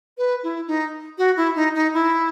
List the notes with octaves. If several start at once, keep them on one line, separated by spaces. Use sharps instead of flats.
B4
E4
D#4
F#4
E4
D#4
D#4
E4